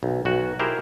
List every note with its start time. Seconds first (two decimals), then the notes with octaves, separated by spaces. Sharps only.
0.03 B1
0.25 B1 F#4
0.59 E4 G4 G#4 A#4 C5